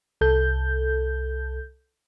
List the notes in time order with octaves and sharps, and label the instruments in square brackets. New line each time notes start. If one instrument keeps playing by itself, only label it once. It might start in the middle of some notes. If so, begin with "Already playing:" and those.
[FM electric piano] C2 A4 G6